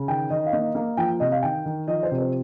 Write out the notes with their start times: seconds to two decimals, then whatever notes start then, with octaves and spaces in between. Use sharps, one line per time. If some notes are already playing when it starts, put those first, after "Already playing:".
Already playing: C#3
0.08 D#3 G5
0.30 D#3 D#5
0.46 F5
0.52 A#3 D#5
0.75 A#3
0.97 F3 G5
1.20 C3 D#5
1.32 F5
1.42 D#3 G5
1.66 D#3
1.88 F3 D#5
2.03 C5
2.11 C3
2.18 C5